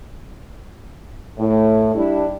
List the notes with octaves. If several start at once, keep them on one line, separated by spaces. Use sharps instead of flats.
A2
G3 D4 E4